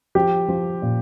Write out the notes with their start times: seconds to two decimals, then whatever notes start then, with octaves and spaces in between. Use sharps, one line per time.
0.15 F3 G4
0.48 F3
0.82 A#2